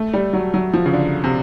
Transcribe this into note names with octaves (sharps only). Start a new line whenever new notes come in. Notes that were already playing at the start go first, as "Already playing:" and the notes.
Already playing: A3
G3
F#3
F#3
F3
C#3
D3
C3